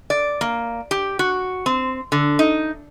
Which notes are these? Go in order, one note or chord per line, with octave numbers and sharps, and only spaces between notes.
D5
A#3
G4
F#4
C4
D3
D#4